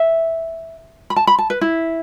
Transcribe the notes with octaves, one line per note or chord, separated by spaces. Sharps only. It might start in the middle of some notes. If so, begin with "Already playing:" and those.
Already playing: E5
B5
A5
B5
A5
B4
E4